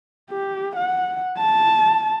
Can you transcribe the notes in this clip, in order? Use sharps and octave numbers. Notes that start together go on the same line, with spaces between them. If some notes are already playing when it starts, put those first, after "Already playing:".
G4
F#5
A5